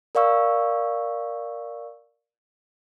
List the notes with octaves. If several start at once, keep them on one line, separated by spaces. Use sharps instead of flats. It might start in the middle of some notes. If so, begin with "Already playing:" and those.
A#4 D5 F5 C#6 E6